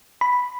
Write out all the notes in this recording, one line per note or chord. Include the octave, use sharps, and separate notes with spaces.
B5